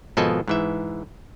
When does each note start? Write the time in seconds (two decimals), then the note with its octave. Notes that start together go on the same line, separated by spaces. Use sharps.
0.17 G#1 B2 F3 A4 D#5 G#5
0.48 G#2 E3 E5